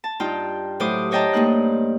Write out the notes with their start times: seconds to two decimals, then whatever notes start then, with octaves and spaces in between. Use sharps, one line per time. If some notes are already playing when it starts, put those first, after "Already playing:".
0.04 A5
0.20 G2 D#4 F4 G5
0.80 A2 F#3 G4 C5 D6 D#6
1.11 C5 C#5 D#5 G5 A5 A#5
1.33 G2 A3 A#3 D#4 F#6